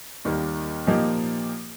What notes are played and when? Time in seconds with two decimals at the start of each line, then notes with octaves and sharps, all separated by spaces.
0.25 D#2 D#3 G3 A#3
0.87 A#2 F3 A#3 D#4 G4